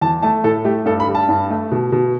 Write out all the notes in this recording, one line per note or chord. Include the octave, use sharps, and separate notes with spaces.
E2 A5
A3 A5
A2 A4
A3 G4
G2 A4
B5
G3
A5
G2
A3
B2
B2